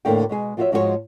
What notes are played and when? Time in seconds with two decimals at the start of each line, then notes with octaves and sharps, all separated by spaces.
0.05 E2 A2 D3 A#3 E4 G5
0.29 B2 G#3 G#4
0.57 F3 F4 F#4 B4 C#5 E5
0.72 G#2 F3 G#3 F#4 A4 C#5